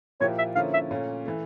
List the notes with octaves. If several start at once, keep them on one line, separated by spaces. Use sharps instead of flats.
A#2 F3 A#3 E4 G4 C#5
E5
D3 F3 A#3 C#4 E4 F5
E5
A#2 A3 C#4
E3 A3